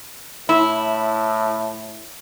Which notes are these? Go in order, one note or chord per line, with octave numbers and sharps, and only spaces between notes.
A2 E4